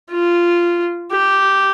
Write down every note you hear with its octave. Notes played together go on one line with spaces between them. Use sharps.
F4
G4